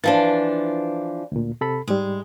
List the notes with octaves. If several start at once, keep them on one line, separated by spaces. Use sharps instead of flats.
E3 F3 D4 A6
D2 A#2
C3 A4 B5
G#2 G3 G#3